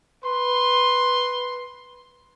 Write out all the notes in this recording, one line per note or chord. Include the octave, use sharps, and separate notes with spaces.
B4 C6